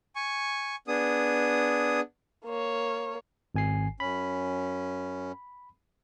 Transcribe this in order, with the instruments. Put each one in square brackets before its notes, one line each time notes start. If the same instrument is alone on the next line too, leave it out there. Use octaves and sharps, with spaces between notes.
[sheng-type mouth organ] G#5 C#6
B3 D4 G#4 D#6
[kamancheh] A#3 C#5
[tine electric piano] G#1 G#5 C7
[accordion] F#2 C#4 [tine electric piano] B5